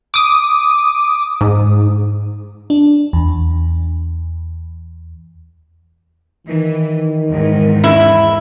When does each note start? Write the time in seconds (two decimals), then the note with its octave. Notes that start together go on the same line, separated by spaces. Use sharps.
0.14 D6 D#6
1.41 G#2
2.70 D4
3.13 E2
6.47 D#3 E3
7.31 E2 G#2
7.84 E4